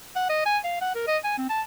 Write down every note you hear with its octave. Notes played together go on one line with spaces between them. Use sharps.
F#5
D#5
G#5
F5
F#5
A#4
D#5
G#5
C4
A5